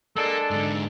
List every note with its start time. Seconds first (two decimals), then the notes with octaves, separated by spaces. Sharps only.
0.17 G#3 A#3 D4 A4
0.51 G#2 D3